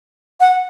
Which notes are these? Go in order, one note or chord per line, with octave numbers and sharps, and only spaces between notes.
F#5